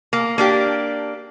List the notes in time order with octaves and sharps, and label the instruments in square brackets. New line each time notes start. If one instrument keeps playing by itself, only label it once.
[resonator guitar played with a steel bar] A#3
A#3 D4 G4